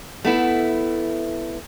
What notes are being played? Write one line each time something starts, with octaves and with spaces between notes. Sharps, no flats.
A3 B3 E4